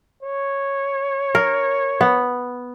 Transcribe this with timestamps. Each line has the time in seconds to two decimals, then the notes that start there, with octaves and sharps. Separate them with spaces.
0.23 C#5
1.35 A#4
2.01 B3